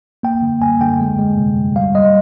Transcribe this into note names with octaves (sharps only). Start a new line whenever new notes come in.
A#3 G5
D3
A#3 G#5
D3 G5
G#3
G#3
C3
C3
G3 F5
G3 D#5